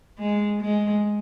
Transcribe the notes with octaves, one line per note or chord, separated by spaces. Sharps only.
G#3
G#3